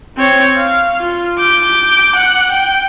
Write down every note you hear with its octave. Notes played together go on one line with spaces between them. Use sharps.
C4 C#5
F5
F4
D6 G6
F#5
G5